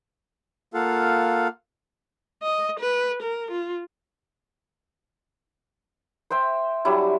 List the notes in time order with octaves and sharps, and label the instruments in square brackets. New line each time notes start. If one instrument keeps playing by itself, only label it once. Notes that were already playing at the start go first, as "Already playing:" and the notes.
[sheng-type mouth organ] A#3 F4 A4 F5 F#5
[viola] D#5
B4
A#4
F4
[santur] C5 E5 G5 C6
F#3 G3 D4 E4